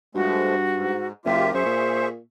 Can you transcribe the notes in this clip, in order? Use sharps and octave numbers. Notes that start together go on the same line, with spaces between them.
G2 F3 G#3 A3 F#4
G#2
F#1 A#3 F4 G4 E5
F#2 G#4 C5 E5 C#6
A#2